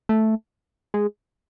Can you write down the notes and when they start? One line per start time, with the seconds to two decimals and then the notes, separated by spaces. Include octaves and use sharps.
0.09 A3
0.94 G#3